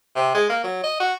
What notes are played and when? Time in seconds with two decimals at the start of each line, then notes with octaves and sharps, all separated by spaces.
0.16 C3
0.35 G#3
0.50 A#3
0.64 F#3
0.84 D#5
1.00 F#4